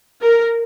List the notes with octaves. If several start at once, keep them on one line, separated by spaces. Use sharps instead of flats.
A#4